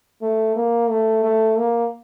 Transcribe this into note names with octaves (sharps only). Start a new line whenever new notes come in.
A3
A#3
A3
A3
A#3